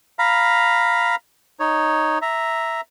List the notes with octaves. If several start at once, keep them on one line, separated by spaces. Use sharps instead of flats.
F5 A#5 B5
D#4 C#5
E5 A#5